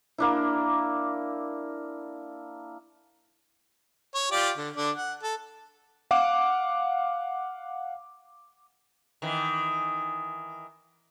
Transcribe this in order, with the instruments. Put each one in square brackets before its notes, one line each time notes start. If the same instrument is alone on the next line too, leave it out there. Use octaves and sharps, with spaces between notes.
[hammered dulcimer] A#3 D4 E4
[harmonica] C#5
F4 G4 D5
D3
D3 D4
F#5
A4
[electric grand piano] F5 F#5 D6
[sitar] D#3 E3